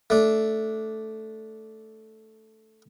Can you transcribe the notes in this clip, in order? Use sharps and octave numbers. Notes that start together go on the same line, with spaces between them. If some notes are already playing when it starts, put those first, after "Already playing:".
A3 D4